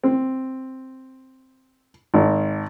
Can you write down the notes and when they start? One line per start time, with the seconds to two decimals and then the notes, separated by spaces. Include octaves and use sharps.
0.03 C4
2.14 G#1